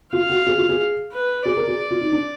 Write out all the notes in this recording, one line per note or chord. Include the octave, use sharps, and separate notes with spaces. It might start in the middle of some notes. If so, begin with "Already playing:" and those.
F4 F5
F#4
G#4
F4
G#4
B4
G#4 D5
A#4
G#4
F4
D#4
D4